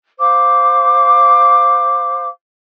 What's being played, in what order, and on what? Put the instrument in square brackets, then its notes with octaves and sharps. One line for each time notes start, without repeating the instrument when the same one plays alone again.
[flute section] C5 F5 D6